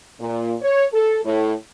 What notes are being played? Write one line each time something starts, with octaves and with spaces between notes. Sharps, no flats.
A#2
C#5
A4
A2